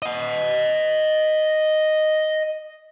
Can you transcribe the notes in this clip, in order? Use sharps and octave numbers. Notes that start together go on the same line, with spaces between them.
D#5 F#5